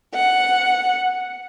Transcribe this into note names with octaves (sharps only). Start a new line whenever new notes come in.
F#5